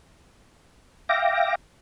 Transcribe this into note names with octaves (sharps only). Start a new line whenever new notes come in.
E5 F5 G5 D6 A#6